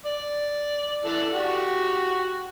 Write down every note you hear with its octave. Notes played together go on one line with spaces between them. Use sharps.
D5
E3 A4 D5
F#4 G4